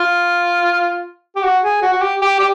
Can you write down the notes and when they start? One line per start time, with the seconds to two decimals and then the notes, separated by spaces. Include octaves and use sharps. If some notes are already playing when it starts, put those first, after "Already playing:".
Already playing: F4
1.36 G4
1.44 F#4
1.63 G#4
1.82 F#4
1.93 F#4
2.02 G4
2.21 G4
2.39 G4